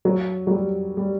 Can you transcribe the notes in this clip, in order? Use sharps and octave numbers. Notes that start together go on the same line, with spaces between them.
F#3
F#3
G3
G3